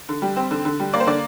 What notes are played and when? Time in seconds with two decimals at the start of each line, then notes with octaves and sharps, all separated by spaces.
0.09 D3
0.22 G3
0.36 C4
0.51 D3
0.65 D3
0.80 G3
0.93 A#3 D5
1.00 C5
1.07 D3 D5